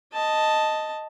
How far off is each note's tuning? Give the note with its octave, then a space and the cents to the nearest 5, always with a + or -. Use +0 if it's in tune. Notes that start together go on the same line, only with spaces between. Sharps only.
D#5 +0 A5 +0